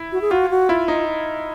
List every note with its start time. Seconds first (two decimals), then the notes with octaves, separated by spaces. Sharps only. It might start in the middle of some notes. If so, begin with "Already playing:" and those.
Already playing: E4
0.12 F#4
0.21 G#4
0.31 F4 F#4
0.50 F#4
0.69 E4 F4
0.88 D#4